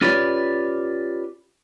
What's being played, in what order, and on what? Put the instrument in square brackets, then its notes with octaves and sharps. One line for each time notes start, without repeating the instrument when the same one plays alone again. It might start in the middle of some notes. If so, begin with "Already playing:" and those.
[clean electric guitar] C#4 F4 G4 B4 C#5 D5